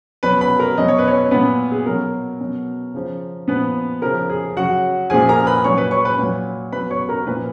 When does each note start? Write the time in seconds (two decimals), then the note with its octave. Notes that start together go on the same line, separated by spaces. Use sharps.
0.23 B2 F#3 B4 B5
0.41 B4 B5
0.59 A#4 A#5
0.78 B2 F#3 D#5
0.88 C#5
0.99 B4
1.08 C#4 C#5
1.31 A#2 F#3 B3 B4
1.72 G#4
1.86 B2 F#3 A#4
2.40 B2 F#3
2.94 C#3 F3
3.48 A#2 F3 B3 B4
4.02 C#3 F3 A#4
4.29 G#4
4.57 C#3 F#3 F#4 F#5
5.10 A#2 F3 G#4 G#5
5.29 A#4 A#5
5.46 B4 B5
5.64 A#2 F#3 C#5 C#6
5.78 B4 B5
5.91 C#5 C#6
6.05 B4 B5
6.19 A#2 F#3
6.72 B2 F#3 B4 B5
6.91 C#5 C#6
7.09 A#4 A#5
7.27 A#2 F3 B4 B5